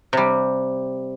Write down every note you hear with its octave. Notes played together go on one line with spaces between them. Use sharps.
C3 G3